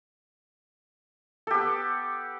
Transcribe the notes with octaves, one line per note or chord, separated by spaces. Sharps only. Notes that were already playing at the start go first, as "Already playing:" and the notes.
B3 G4 A4